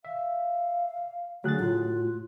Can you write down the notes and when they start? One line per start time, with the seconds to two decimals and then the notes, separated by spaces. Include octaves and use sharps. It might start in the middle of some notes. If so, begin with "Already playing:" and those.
0.05 E5 F5
1.44 D3 F#3 A3 F#4 G#4 F#6 A6
1.60 A2 F4